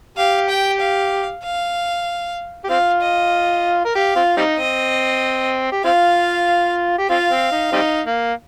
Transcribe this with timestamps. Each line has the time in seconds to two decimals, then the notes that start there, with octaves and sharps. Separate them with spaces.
0.17 G4 F5
0.49 G5
0.81 F5
1.44 F5
2.64 G4
2.69 C4 F4 F5
3.01 D#5
3.85 A#4
3.95 G4 F5
4.16 C4 F4
4.37 G3 C4 D#4
4.58 C4 D#5
5.72 G4
5.84 C4 F4 F5
6.98 G4
7.10 C4 F4 F5
7.31 C4
7.52 D#4
7.72 G3 C4 D#4
8.04 A#3